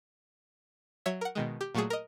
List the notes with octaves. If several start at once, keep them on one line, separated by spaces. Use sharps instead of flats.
F#3 C#5 E5
A#4 F#5
B2 D#3 G#3
G4
A#2 F#3 A3 F#4 G#4
A#4 D#5